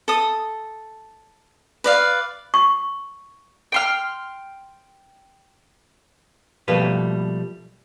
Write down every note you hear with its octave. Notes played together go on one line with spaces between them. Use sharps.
A4 D#6
B4 D5 F5
C#6
G5 C6 F6
B2 F3 G3 A3 A#3 B4